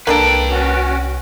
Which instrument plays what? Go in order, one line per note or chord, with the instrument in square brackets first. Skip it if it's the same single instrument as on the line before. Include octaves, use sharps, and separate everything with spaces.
[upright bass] C2 [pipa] A#3 D4 A4 [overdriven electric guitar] B4 G5
[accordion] C#4 F#4